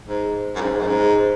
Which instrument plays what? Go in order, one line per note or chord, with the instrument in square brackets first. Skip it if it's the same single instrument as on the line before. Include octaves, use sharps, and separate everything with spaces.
[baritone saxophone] G#2
F#2
G#2
F#2
G#2